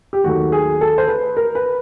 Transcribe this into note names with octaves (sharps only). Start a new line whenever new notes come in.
G4
D#2 D#3 F#3 A3 F#4
G#4
A4
C5
B4
A#4
B4